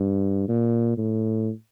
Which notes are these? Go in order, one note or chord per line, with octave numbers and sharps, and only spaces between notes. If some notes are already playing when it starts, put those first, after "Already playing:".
Already playing: G2
A#2
A2